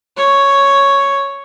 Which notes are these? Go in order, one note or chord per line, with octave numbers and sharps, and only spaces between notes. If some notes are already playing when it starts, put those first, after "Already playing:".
C#5